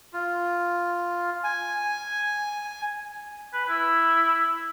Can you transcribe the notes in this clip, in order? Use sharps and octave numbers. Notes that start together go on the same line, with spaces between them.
F4
G#5
B4
E4